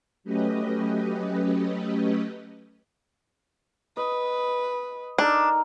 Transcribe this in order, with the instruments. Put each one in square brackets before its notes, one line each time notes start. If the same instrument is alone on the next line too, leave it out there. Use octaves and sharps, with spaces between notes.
[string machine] F#3 A3 C#4 G4 B4 D#5
[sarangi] B4 [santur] D#5
[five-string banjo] D4 [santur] D#4 A4 A#4